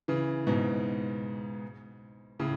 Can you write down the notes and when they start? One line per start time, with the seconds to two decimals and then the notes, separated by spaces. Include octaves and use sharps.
0.08 C#3 E3
0.47 G#2 B2
2.40 A2 C#3